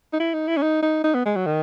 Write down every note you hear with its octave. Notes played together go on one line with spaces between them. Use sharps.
D#4
E4
D#4
E4
C#4
D#4
D#4
D#4
B3
G#3
F#3
D#3